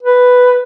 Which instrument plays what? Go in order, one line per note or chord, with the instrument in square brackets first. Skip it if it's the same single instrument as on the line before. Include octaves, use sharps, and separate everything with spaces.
[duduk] B4